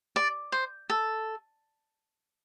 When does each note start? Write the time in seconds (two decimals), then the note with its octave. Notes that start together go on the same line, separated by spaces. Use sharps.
0.16 D5
0.52 C5
0.90 A4